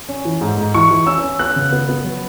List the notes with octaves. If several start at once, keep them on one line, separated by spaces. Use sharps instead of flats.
C#4
E3
G#2
G#2
E3 C#6
E3
C#4 E6
C#4
B3 F#6
C#3
B3
B3
F#3